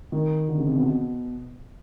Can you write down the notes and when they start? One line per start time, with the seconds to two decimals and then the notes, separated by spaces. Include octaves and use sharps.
0.12 D#3
0.49 D3
0.58 C#3
0.67 C3
0.76 B2